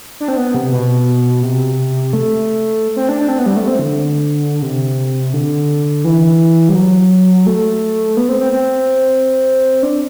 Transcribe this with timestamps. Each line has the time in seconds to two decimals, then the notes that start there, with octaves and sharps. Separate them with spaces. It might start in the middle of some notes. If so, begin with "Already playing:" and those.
0.20 D4
0.28 C4
0.37 B3
0.54 C3
0.72 B2
1.43 C3
2.13 A3
2.96 C4
3.09 D4
3.20 D4
3.28 C4
3.38 B3
3.46 G3
3.56 A3
3.67 C4
3.79 D3
4.62 C3
5.34 D3
6.04 E3
6.69 G3
6.75 F#3
7.46 A3
8.17 B3
8.29 C4
8.40 C4
8.52 C4
9.83 D4